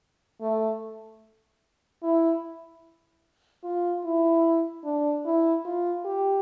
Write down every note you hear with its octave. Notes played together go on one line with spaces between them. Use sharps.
A3
E4
F4
E4
D4
E4
F4
G4